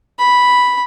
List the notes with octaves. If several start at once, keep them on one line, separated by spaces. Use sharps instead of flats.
B5